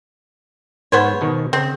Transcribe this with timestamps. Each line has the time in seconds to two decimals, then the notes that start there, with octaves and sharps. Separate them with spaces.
0.92 G#2 B3 C5 C#5
1.21 B2 D#3
1.53 C#3 C4